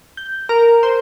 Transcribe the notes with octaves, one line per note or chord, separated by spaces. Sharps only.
G6
A#4
C5